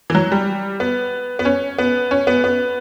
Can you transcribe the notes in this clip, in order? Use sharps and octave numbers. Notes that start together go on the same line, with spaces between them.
E3
F#3
G3
B3
B3
C#4
B3
C#4
B3
B3